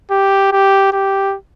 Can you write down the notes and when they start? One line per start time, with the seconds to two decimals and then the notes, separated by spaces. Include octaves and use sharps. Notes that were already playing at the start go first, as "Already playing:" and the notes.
0.11 G4
0.52 G4
0.92 G4